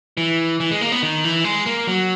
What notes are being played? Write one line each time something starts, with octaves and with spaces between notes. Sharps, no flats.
E3
E3
G#3
A#3
B3
D#3
E3
G#3
A#3
F#3